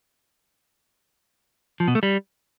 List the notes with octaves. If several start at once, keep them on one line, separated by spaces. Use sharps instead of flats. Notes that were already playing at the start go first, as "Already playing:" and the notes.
F3
B2
A3
G3